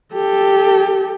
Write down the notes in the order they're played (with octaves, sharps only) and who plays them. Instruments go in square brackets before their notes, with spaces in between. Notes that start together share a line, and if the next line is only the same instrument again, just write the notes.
[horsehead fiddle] G4 A4